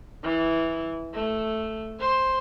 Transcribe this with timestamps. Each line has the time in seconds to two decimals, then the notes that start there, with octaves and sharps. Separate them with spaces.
0.23 E3
1.14 A3
2.00 C5